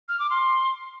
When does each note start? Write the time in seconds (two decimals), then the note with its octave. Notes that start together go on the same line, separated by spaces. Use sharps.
0.09 F6
0.19 D6
0.30 C6